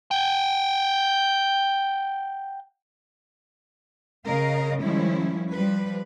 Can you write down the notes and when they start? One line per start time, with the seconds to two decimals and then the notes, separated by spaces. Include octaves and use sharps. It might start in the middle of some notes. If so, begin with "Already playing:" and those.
0.11 F#5 G5
4.25 C#3 A#4 D#5 F5
4.82 D#3 F3 G3 G#3 C#4 E4
5.51 F3 G3 B4